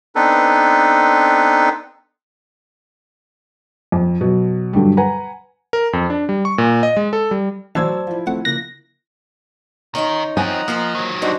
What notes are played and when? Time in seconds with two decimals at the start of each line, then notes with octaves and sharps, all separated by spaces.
0.15 B3 C4 D4 D#4 A4 B4
3.92 F2
4.21 B2 F#3
4.73 G2 D3 F#3 G3
4.97 B4 F#5 G#5 A#5
5.73 A#4
5.93 F2
6.10 D4
6.29 G3
6.45 C#6
6.58 A#2
6.83 D#5
6.97 G#3
7.13 A4
7.31 G3
7.75 A1 F#3 C5 D5 A5 E6 G#6
8.07 F3 E4
8.27 A3 C4 F#5
8.45 C#3 A#3 F#6 A#6
9.95 D#3 C#4 D#4 F4
10.37 F3 C4 D#5 F#5 G#5 A#5
10.68 F3 A#3 F4 C5
10.95 D#3 F#3
11.22 E2 G3 D4 D#4 F#4 C5